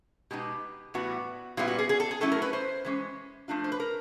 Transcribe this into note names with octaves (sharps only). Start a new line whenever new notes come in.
B2 G#3 B3 D#4 G4
A2 E3 G3 B3 F#4
A#2 G3 B3 E4 F4
F#4
G#4
G#4
A4
G#4
F#3 A3 C#4 E4 A4
A#4
B4
C5
E3 G#3 C#4
F3 A3 D4 F4
C5
B4
A#4